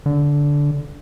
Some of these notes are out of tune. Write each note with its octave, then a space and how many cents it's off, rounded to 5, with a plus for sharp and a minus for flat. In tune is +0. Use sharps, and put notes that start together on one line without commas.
D3 -15